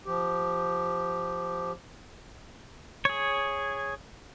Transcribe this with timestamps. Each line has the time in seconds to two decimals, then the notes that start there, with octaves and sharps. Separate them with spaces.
0.06 F3 G4
3.05 G#4 C#5